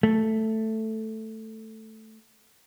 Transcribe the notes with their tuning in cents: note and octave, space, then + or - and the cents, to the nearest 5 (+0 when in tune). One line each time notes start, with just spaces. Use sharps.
A3 +5